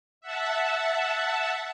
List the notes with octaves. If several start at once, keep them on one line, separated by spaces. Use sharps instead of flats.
E5 F#5 A5